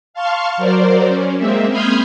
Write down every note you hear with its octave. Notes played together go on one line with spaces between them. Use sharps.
F5 A5 C6 C#6 F6
F#3 A#4 C5 D5
C#4
G#3 A#3 C4 E5
B5 C6 D#6 F6 G6 G#6